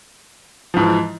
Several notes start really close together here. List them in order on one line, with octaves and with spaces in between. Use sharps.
F3 G#2 E3